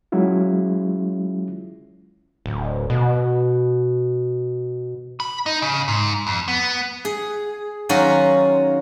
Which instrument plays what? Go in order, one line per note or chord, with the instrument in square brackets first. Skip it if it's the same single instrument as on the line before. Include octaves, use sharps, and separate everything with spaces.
[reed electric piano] F#3 G#3 C#4 E4 F4
[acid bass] D1
B2
[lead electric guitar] B5
D#4
C#3
G#2
F2
B3
[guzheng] G#4
D#3 F#3 C#4 F4 F#4